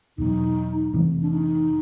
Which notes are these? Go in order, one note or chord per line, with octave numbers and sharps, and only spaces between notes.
E2 B2 F#3 D#4
F2 C3 E3 A3
D4
D#4